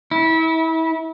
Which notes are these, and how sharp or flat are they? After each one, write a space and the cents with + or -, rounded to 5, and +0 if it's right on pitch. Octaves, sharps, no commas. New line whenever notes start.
E4 -30